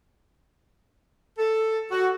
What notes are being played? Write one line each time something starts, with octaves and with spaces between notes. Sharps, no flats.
A4
F#4